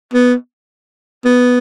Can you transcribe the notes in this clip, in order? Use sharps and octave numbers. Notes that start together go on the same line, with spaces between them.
B3
B3